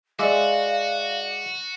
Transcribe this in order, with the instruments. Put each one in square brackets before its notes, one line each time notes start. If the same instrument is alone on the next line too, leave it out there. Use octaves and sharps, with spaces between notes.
[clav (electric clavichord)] G#3 E5 [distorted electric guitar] F#4 [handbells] D5 D6 [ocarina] F5